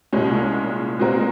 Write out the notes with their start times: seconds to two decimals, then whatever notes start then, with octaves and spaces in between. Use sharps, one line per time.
0.13 C2 A#2 G#3 C#4
0.99 A#2 G#3 C4 F#4 A#4